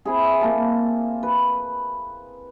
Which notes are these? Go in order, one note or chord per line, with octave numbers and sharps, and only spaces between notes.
C4 E4 G#4
A#3 F5 A5
B4